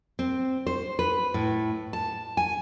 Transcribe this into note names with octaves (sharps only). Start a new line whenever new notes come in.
C4
C5
B4
A2
A5
G#5